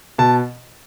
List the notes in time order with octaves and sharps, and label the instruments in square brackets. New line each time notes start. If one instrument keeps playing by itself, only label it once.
[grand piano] B2 A5